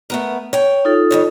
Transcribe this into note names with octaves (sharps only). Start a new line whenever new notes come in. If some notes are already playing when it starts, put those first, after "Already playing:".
A3 B3 A#4
C#5 G5
D#4 F4 A4
F2 B2 C#5